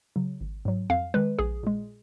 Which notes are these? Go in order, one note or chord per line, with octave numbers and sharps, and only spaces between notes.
C#3 F#3
G#1
G#2 F#3
F2 F5
D#3 G#3 B4
A#1 G#4
A#2 G#3